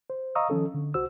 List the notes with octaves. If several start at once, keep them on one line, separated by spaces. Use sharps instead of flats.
C5
D#5 F5 A#5 C#6 D#6 E6
D#3 F3 C#4 A4
D3
C2 F#4 C5 E6